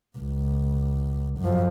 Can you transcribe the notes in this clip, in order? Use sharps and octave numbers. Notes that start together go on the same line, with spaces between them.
C#2
F#2 F3